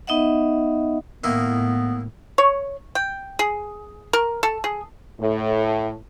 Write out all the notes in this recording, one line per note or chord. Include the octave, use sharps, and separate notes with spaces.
B3 D#4 D#5 E5 F#5
A2 D#3 A#3 B3 E4
C#5
G5
G#4
A#4
A4
G#4
A2